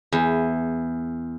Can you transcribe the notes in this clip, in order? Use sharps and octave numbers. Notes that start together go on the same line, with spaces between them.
E2